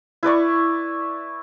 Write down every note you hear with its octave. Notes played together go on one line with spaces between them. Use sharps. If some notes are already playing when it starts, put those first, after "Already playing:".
E4 B4 D5 C#6